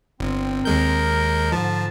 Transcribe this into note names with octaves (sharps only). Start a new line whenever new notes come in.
G1 C4
D#2 G#3 A#4 G6
G#2 D3 F3 A5